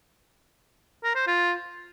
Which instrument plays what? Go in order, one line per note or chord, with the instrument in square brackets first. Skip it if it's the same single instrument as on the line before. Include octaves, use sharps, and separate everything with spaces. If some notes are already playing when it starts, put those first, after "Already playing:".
[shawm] A#4
C5
F4